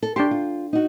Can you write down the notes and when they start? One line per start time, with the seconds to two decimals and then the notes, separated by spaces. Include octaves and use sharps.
0.03 A4
0.16 D4 G4 G5 C6
0.31 F4
0.73 D#4 F#4